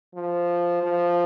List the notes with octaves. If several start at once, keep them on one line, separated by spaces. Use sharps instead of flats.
F3
F3